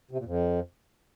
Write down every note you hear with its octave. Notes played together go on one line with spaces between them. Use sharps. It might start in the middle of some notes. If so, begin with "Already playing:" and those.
C3
A#2
F2